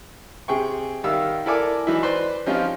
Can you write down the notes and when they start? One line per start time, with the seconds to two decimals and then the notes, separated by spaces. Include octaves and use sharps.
0.48 C3 G#4 G5 C#6
1.04 D#3 G3 E5 F5 E6
1.46 E4 A4 A#4 D5 G#5 D6
1.87 E3 F#3 D#4 E4
2.03 B4 C5 D5 B5 C6
2.46 F3 G3 C4 C#4 D#4 F4